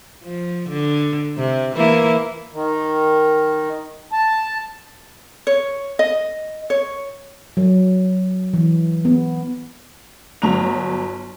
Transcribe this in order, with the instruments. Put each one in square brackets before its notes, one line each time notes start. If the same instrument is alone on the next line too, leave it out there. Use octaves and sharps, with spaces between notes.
[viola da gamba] F3
D3
C3
E3 A#3 E4
[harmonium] D#3
A5
[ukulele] C#5
D#5
C#5
[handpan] F#3
E3
B3
[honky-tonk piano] G1 F#3 A#5 F7